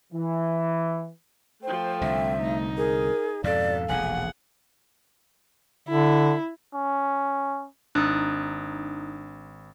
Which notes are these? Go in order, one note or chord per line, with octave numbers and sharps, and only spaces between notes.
E3
F3 A3 C5 G5
C2 D3 E5
A3 D#4
G#4 A#4
F2 G#2 B2 A4 D5 F5
E1 A#1 G#4 F#5 G#5
D3 E4
C#4
G#1 D4 D#4 D#6 F#6